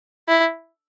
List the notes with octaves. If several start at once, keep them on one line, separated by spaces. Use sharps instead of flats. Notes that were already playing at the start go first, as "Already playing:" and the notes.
E4